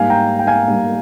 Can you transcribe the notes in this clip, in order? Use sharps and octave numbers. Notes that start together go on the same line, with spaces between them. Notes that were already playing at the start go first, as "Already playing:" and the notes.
Already playing: G#2 G3 A#3 F5 G#5
G5 A#5
G5
F5 G#5
G#2 G3 A#3